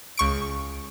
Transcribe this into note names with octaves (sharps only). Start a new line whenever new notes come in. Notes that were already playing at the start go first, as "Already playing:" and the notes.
C#2 C#6 D7